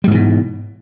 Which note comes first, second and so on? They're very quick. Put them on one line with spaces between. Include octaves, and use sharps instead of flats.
G3 G#2 E3 B2